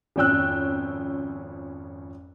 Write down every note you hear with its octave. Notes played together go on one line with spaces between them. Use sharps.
G#1 F2 C#4 G5 E6 F#6